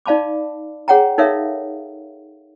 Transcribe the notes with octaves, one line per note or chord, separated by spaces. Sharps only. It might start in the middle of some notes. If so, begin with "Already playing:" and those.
D#4 D5 F5 A5 B5 D6
G#4 C#5 F#5 G5 A#5
D#4 A4 A#4 C#5 E5 F5